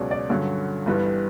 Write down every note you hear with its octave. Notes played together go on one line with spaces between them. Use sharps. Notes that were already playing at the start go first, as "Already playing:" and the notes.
Already playing: C#2 B2 F#3 C#4 D5
D5
G2 D3 F#3 C#4 C#5
G1 G2 E3 G3 B4